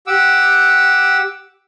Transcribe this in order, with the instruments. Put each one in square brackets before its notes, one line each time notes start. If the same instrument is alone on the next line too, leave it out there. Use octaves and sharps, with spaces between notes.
[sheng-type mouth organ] G4 F#5 D6 E6